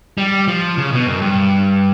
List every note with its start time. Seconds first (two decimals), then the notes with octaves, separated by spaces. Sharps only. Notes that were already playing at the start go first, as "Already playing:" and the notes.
0.18 G3
0.48 F3
0.78 C#3
0.92 B2
1.07 F#2
1.22 G2